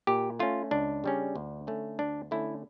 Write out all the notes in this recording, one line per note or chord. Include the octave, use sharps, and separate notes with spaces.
A#2 G4
A3 C#4 F4
C#2 D4
C#3 G3 C#4
D2
D3 A3 C#4
D2 D4
D3 A3 C#4 E4